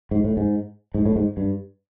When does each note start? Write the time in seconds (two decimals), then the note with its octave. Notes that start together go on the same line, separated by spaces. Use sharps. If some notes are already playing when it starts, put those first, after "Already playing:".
0.11 G#2
0.24 A2
0.37 G#2
0.94 G#2
1.06 A2
1.16 G#2
1.37 G2